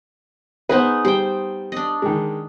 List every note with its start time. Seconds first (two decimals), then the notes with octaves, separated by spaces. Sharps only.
0.69 B3 D#4 G#4 B4 C5
1.05 G3 C5 G5
1.72 D4 D#5
2.02 D#3 G#3